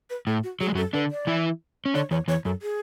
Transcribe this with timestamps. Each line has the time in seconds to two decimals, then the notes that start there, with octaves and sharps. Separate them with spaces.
0.10 B4
0.27 A2 A4
0.44 F#4
0.60 F#3 G#4
0.67 G#3
0.75 F#2 F#3 A4
0.93 D3 D4 B4
1.11 D5
1.27 E3 E4
1.86 C#4
1.94 D3 D4 C#5
2.11 E2 E3 C#5
2.28 E2 E3 C#5
2.45 F#2 A4
2.62 G#4